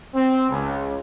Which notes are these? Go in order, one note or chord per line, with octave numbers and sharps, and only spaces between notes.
C4
C#2